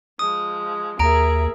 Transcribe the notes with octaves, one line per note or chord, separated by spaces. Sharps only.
F3 G#3 D#6
D#2 G#4 A#4 E5 A#5 D7